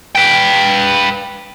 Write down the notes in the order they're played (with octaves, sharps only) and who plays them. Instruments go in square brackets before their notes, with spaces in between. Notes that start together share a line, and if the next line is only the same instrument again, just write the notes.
[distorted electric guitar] B4 G5